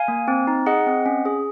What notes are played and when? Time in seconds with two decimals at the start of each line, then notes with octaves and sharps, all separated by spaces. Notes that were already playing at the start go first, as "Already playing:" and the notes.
Already playing: F5 G#5
0.08 A#3
0.28 C4
0.47 D#4
0.66 G#4 D#5 F#5
0.86 C4
1.06 C#4
1.25 G#4